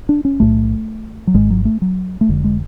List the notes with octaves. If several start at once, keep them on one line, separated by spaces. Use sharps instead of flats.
D4
C#4
B1 A2 A3
F#3
G#1 G#2 G#3
F#3
A3
F#3
A3
F1 F2 D3 G#3
G#3